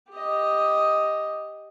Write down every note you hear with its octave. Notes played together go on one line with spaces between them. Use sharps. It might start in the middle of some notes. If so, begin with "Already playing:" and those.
G4 D#5